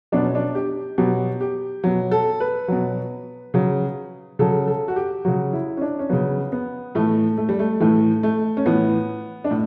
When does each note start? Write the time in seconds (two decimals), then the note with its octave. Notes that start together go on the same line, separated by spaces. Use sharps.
0.12 B2 F#3 D4
0.24 C#4
0.35 D4
0.55 G4
0.98 B2 F#3 G4
1.41 G4
1.84 B2 F#3
2.11 A4
2.40 B4
2.68 B2 F#3
3.54 C#3 F#3
4.39 C#3 F#3 A4
4.67 A4
4.88 F#4
4.96 G4
5.25 C#3 F#3 F#4
5.53 E4
5.77 C#4
5.81 D4
5.99 C#4
6.09 C#3 F#3 B3
6.52 B3
6.95 A2 E3 A3
7.38 A3
7.49 G3
7.59 A3
7.80 A2 E3 A3
8.23 A3
8.57 C#4
8.66 A2 E3 B3
9.44 D4
9.51 A2